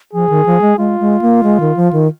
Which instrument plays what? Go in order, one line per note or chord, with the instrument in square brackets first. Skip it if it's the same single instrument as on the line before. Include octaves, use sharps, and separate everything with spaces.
[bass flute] F3 [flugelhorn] G#4
[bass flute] D#3
F3
G#3
[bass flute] G#3 [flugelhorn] F4
[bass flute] G#3
A#3
G#3
D#3
F3
D#3